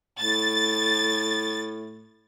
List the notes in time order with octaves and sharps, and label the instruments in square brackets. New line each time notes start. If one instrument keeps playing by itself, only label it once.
[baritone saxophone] A2 [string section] A6